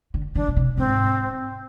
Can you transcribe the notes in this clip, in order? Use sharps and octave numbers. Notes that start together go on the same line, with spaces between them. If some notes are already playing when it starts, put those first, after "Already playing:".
D3
D#3 D4
B2
C3
G#2 C4